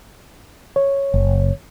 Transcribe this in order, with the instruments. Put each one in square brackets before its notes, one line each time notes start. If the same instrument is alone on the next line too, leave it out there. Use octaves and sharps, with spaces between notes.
[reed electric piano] C#5
[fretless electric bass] F#1